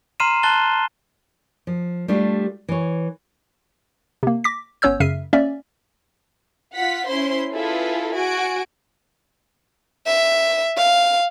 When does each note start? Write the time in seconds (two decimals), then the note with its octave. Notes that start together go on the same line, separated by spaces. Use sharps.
0.20 A#5 C6 F6 C7 D#7 E7
0.43 A5 C6 F#6 A6 G7
1.67 F3
2.08 G3 A3 D4 F4 G4
2.69 E3 C#5
4.23 C3 A#3
4.44 D6 A#6 B6
4.82 G1 B3 C#4 C#5 E6 G6
5.00 F#2 C#3 E5 F6 C7 D#7
5.33 A#3 C#4 D5 E5
6.74 F4 F#5 B6
7.07 C#4 E4 C5 C6
7.52 E4 F4 G#4 A4 B4
8.15 F#4 G#5 D7
10.07 E5
10.77 F5